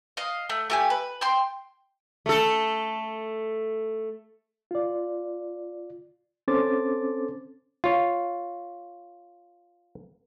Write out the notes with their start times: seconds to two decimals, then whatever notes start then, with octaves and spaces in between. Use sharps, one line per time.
0.17 D#5 F5
0.50 A3
0.70 A3 G4 G#5
0.90 B4
1.21 G5 C6
2.26 A3 A4
4.71 F4 D5
6.48 C4 C#4 A4 C5 D6 A6
7.84 F4 C#5